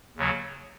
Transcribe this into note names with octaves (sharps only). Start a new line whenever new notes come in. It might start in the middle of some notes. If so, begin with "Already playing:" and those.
D#2 C#3 F#3